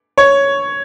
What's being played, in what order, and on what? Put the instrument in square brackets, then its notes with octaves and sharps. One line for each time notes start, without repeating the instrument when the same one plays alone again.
[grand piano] C#5